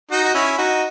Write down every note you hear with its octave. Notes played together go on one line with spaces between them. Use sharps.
D#4 F#4
F#4
C#4 E4
D#4 F#4